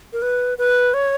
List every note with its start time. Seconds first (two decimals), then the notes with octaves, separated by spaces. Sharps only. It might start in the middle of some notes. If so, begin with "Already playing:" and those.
0.13 A#4
0.22 B4
0.58 B4
0.94 C#5